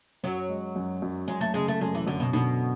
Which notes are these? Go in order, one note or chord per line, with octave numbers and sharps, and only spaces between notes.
F#2 F#3
G#3
F#2
F#2
F#2 G#3
A3
C#3 G#3
A3
F#2 G#3
E3
F#2 D3
B2
B2 D3